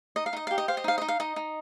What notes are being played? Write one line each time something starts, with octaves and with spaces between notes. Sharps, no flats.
D#4 D#5
F5
D#4 D#5
G4 F5
D#5
C5 F5
D#5
D#4 F5
D#4 D#5
F5
D#4 D#5
D#4